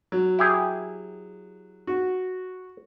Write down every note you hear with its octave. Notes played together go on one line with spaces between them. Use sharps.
F#3
E4 G4 G#4
F#4